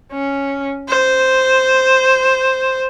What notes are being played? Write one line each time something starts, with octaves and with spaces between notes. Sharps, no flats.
C#4
C5